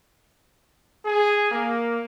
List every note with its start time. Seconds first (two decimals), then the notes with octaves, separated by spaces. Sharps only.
1.05 G#4
1.52 A#3